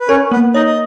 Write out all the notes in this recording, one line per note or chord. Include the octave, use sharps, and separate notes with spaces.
B4
C#4 A#4 C#5
A#3 B3 B4
D#4 C#5 D#5
D#5